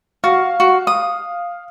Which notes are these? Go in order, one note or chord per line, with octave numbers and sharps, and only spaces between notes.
F#4 F5
F#4
D#6